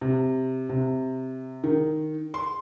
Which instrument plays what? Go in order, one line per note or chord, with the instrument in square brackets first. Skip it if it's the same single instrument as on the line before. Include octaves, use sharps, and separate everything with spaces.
[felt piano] C3
C3
D#3
C6